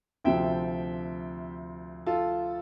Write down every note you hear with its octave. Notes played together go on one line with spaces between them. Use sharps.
D2 C3 F3 E5 G5
F4 A4